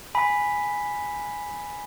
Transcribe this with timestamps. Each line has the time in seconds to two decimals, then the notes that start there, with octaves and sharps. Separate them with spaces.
0.15 G#5 B5 B6